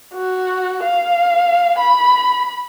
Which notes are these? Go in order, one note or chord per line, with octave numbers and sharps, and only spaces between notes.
F#4
F5
B5